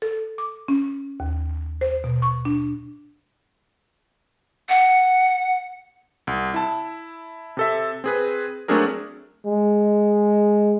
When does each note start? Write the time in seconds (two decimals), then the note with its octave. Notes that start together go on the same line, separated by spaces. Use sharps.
0.02 A4
0.38 D6
0.68 C#4
1.20 D#2
1.81 C5
2.04 B2
2.22 C#6
2.45 D4
4.69 F#5
6.27 C2
6.54 E4 A5
7.57 C3 A4 E5
8.04 C4 G#4 B4
8.68 F#3 A3 C4 D4 G#4 A#4
9.46 G#3